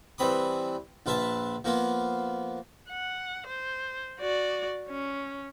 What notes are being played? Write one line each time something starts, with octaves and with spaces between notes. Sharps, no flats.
E3 G3 C4 B5 D#6
A#1 F4 B4 E5 A5
F3 A#3 B3 F4
F#5
C5
F#4 D5
C#4